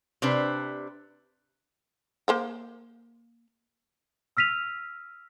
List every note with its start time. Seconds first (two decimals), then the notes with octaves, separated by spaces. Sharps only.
0.22 C3 D4 B4 C5
2.28 A#3 C5 G5
4.37 E6 F6 B6 D#7 F7